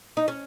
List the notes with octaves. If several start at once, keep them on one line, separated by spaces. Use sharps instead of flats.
D#4
C#4